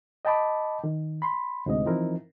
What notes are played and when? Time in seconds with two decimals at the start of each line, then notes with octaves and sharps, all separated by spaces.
0.25 D#5 G5 A5 B5 D6
0.84 D#3
1.22 B5 C6
1.66 D2 G#2 C3 D#5
1.86 E3 F3 C4 D#4 E4 A#4